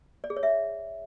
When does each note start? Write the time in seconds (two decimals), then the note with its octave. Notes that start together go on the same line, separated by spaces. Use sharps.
0.24 D5
0.30 G#4
0.36 C#5
0.43 E5